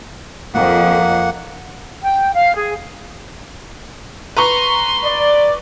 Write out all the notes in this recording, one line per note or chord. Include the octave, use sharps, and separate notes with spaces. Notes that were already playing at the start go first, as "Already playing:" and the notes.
F2 A#3 F#5
G5
F5
G#4
B4 A#5 C6 C#6
D5